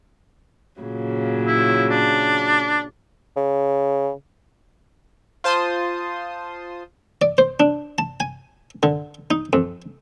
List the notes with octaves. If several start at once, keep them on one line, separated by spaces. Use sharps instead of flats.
A#2 C#3 F#3
E4
D4
C#3
F4 C5 A5 C6 D#6
D5
C5
D4
A5
G#5
D3
D#4
F2